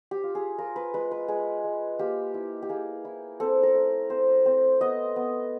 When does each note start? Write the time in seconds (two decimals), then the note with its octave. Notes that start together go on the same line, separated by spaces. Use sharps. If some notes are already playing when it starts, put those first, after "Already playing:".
0.11 G4
0.24 F4
0.35 G#4
0.58 F4 A#4
0.76 B4
0.94 G#3 B4
1.11 B4
1.28 G#3 G#4
1.64 G#3
1.99 A#3 G4
2.34 E4
2.62 G4
2.69 A#3 G#4
3.05 E4
3.40 C4 A4
3.63 A#4
3.75 A3
4.10 C4 C5
4.46 C4
4.81 B3 D#5
5.16 B3